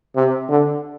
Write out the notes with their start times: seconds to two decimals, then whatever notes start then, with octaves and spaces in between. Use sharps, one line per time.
0.15 C3
0.49 D3